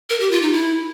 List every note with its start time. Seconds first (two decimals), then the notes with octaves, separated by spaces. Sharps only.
0.10 A#4
0.20 G4
0.31 F4
0.42 D#4
0.53 E4